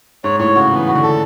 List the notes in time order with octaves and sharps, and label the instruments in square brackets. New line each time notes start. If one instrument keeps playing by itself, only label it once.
[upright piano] G#2 [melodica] C#5
[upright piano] A2 [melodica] C#5
[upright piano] C#3 [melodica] F#4
[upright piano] E3 [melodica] B3
[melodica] F#4
[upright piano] D3
[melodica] A4